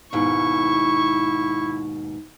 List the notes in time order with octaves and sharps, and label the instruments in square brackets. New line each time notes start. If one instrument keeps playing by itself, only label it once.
[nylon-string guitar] D#2 G#2 B2 [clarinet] E4 [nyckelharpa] C#6